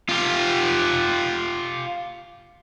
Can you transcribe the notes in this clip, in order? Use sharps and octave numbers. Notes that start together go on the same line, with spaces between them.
F4 G4